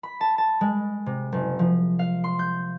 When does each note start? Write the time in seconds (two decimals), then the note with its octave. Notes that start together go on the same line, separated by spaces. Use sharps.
0.03 B5
0.21 A5
0.38 A5
0.61 G#3
1.06 C3
1.32 F#1
1.59 F3
1.99 F5
2.24 C6
2.39 G6